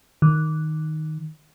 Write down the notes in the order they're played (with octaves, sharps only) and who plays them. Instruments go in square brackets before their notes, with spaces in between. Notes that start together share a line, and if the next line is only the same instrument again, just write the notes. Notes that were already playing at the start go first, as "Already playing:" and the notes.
[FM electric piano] D#3